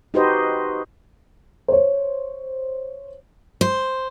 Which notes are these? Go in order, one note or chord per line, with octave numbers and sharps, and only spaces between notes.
D#4 F#4 G4 B4 C5 D#5
C5 C#5
C5